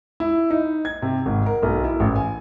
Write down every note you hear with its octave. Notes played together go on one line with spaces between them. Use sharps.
E4
D#4
G#6
C3
G#1
A#4
B1
E4
A1
G#5